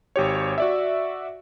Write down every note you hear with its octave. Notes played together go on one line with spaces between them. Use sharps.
G#1 G4 C#5
F#4 D5 E5